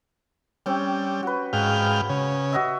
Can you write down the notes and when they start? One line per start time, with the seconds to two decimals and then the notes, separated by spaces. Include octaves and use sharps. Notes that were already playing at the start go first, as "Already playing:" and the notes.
0.66 G3 C4 C#4
1.23 F#4 B4
1.53 G#2 F5 G5
2.09 C#3
2.53 F#4 D#5 E5